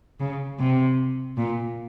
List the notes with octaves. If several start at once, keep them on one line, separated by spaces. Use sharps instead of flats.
C#3
C3
A#2